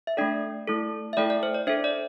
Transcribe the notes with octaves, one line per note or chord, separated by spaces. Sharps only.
E5
A3 D4 A4 D5 G5
A3 E4 A4
E5
A3 E4 A4 D5 G5
D5
C5
D5
D4 A4 C5 E5
D5